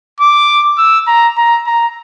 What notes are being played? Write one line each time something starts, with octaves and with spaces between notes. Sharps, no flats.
D6
E6
A#5
A#5
A#5